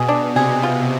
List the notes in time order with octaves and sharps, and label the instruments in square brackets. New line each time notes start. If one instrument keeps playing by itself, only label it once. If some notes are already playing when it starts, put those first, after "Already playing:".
Already playing: [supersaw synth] B2 [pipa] G#4
[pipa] D4
[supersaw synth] C3 [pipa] G#4
[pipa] F4